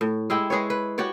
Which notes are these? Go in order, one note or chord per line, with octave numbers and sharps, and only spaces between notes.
A2
G#3 E4 G4 G5
G#3 G#4 B4 C#5
B4
F#4 G4 C#5 D5